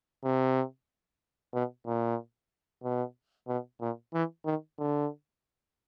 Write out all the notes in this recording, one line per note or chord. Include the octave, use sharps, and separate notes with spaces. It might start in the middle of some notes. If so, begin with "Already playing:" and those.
C3
B2
A#2
B2
B2
A#2
E3
D#3
D3